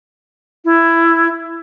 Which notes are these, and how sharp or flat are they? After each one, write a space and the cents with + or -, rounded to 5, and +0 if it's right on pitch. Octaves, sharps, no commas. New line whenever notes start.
E4 +10